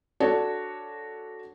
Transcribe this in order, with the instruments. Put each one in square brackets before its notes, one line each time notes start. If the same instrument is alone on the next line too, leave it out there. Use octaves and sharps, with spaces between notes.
[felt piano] D4 F#4 A4 C#5